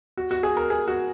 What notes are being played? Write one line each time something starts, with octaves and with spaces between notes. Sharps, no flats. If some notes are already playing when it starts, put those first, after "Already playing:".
F#4
F#4
G#4
A#4
G#4
F#4